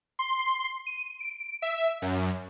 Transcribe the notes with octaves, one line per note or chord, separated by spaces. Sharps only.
C6
D#7
D7
E5
F#2